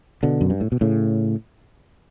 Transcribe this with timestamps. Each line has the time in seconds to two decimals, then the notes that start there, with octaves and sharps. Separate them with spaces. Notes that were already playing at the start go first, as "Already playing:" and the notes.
0.23 B2 D3
0.41 F#2
0.50 G2
0.61 A2
0.72 B2
0.81 A2 C#3